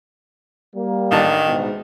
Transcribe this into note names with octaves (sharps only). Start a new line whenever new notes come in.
G3 A#3
A1 D#3 D4 A5
G#2 B2